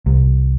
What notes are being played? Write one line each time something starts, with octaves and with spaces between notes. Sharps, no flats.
C2